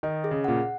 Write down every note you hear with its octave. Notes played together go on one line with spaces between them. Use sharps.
D#3 D#5
G#4
C#3
A#2 F#5